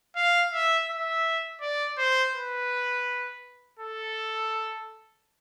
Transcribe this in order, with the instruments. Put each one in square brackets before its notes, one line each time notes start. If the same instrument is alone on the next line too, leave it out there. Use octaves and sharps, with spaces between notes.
[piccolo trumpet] F5
E5
E5
D5
C5
B4
A4